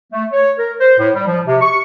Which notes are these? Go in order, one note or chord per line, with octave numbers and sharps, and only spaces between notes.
A3
C#5
A#4
C5
A2
G3
F3
C3
C#6